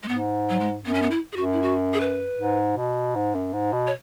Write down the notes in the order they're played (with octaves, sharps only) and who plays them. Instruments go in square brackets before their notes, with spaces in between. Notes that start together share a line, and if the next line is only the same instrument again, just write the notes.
[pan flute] G#3
[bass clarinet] G#2 [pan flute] B3
[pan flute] F#3
G#3
[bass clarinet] F#2 [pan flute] B3
[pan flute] C#4
B3
E4
G#4
[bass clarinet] F#2 [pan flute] F#4
[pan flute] E4
F#4
G#4
B4
[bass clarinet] G#2
B2
G#2
F#2
G#2
B2
[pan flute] C#5